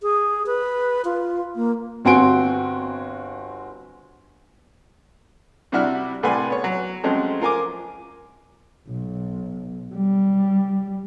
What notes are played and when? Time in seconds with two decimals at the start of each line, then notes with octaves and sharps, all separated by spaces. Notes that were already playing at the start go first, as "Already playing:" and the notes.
0.03 G#4
0.46 B4
1.05 F4
1.56 A#3
2.05 G1 C4 F#4 G#5 C6 D7
5.72 C3 G3 D4 E4 F#4 F6
6.23 C2 A2 B4 F#5 G#5 C6
6.50 B3 C#5
6.64 F#3
7.03 C#3 F3 F#3 G#3 A3 C4
7.41 F4 A#4 G#5 D6
8.89 B1
9.94 G3